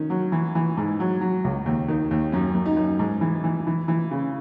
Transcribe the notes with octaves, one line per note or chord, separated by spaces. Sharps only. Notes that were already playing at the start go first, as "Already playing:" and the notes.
Already playing: D#3 C#4
F#3
E3
E3
G#2
F#3
F#3
C#2
D#2
D#3
D#2
F#2 C#4
F#2
D#4
F#2
G#2
E3
E3
E3
E3
C#3